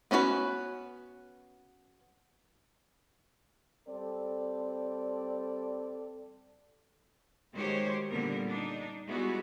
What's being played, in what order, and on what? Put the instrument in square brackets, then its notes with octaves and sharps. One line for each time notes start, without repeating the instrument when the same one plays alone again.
[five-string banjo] B3 C#4 D4 F#4 B4
[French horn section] G3 C4 A4 D5
[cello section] D#3 G#3 F#4 G4 C5 C#5
A#2 D3 G3 B3 A#4
D4 D#4
G3 G#3 B3 E4 F#4